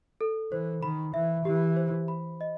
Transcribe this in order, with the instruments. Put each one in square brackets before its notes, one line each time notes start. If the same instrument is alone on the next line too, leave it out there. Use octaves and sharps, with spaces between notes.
[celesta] A4
[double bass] E3 [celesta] C5
[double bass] D#3 [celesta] B5
[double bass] E3 [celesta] E5
[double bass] E3 [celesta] G4
[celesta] C5
B5
D#5